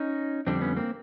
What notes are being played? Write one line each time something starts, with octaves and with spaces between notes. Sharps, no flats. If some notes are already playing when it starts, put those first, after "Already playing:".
Already playing: C#4 D#4
F2 D3 G3 C4 D4
B3 C#4
A#3 C4